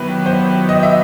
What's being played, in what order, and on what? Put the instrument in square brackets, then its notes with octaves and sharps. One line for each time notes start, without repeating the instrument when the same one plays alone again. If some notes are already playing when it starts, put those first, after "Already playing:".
Already playing: [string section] D#3 F#3 B3 E4 G4 [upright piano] B4
[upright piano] C5
D#5
E5